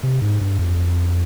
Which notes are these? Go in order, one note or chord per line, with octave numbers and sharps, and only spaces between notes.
C3
G#2
G2
F2